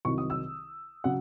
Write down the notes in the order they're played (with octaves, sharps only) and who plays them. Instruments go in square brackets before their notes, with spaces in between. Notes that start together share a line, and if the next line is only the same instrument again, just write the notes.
[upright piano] C2 C3 D#3 F#3 C#6
D#6
E6
C#3 F#3 F#5